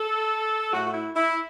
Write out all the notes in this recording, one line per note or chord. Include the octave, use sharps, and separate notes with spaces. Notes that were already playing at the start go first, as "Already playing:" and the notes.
Already playing: A4
A2 A3 F#4
F#4
E4
E4